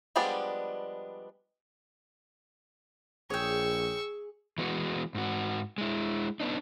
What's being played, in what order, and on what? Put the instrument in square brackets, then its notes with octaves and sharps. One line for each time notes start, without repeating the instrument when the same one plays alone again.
[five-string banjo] F3 G3 G#3 B3 D4
[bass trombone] A#1 [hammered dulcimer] G#4 [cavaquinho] C#5 G5 [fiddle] C#6 E6
[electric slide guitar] E3 G#3 B3 F#4
G#2 F#4
G#3 E4
B3 D4 D#4